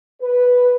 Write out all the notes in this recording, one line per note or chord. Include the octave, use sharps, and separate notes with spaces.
B4